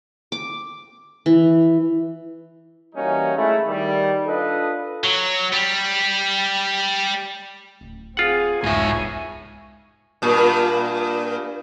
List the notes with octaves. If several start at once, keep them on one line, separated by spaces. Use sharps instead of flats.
D6
E3
E3 G3 A#3 C#4 D#4 F#4
G#3 A3 E4
D#3 G3
D4 F4 A4 B4 D#5
F#3
G3
D1
C4 F4 G#4 F#5
E1 C2 G#2 E5 G#5 C#6
G2 A#2